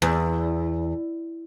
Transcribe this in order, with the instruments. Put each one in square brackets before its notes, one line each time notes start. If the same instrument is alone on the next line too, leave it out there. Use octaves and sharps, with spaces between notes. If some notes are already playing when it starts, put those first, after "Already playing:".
[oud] E2